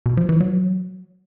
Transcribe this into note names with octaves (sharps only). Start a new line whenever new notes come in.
B2
F3
E3
F#3